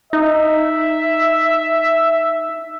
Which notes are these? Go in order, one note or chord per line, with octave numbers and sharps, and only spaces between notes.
D#4 E5